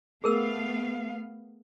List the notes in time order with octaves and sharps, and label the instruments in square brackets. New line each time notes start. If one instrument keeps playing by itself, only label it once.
[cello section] A3 B3 F5 [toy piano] G#4 A#4 E6